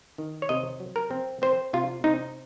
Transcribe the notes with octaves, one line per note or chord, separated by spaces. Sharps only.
D#3
C#5
C3 D#5
F#3
A#4
C4
C4 C5
C3 F4
C3 D#4